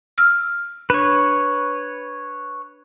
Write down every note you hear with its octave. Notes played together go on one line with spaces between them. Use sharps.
E6 F6
D4 B4 C#5